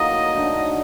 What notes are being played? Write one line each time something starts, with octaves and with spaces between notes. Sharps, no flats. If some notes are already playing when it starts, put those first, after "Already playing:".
Already playing: A2 F#3 A#3 D#4 D#5
D3 A3 D#4